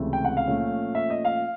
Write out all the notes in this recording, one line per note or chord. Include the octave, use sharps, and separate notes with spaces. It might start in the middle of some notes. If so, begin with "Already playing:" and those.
Already playing: C#2 C3 E3 A3
G5
F#5
F5
A#2 F3 A3 C#4
E5
D#5
F5